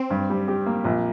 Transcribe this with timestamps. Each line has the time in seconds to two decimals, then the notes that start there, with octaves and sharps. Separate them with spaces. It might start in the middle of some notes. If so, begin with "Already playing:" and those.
Already playing: C4
0.10 G2
0.30 G3
0.48 G4
0.66 A#3
0.85 A#1